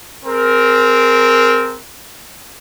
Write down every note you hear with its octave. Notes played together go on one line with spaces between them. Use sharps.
C4 G#4 A#4